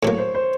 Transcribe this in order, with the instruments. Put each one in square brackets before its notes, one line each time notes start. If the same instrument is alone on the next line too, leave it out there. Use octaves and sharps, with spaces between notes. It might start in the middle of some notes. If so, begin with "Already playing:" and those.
[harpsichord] A2 F#3 A#3 [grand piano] C#5
[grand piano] C5
C5